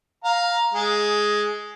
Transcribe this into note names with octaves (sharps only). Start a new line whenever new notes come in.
F5 A#5
G#3